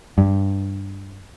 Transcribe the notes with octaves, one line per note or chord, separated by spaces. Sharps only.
G2